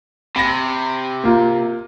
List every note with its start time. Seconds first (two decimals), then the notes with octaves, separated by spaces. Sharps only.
0.36 C3 B5 A#6
1.24 A#3 F4